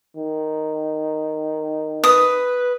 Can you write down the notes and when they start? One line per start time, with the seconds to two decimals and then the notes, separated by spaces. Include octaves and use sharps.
0.17 D#3
2.04 B4 D#6